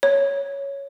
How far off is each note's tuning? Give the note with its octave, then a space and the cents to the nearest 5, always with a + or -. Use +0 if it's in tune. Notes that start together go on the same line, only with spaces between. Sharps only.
C#5 +5